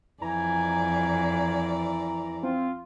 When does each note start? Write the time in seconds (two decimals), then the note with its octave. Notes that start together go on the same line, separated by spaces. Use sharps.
0.22 F2 E3 D5 G#5 A#5
2.43 C4 F4